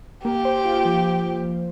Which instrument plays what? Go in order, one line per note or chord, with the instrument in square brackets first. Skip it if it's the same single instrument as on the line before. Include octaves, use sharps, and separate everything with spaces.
[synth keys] A#3 [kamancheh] G4
[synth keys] C5
F4
F3